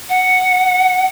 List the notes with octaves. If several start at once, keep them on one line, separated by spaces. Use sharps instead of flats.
F#5